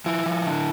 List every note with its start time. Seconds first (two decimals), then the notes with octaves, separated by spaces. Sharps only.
0.06 F3 E4
0.26 F3
0.45 D3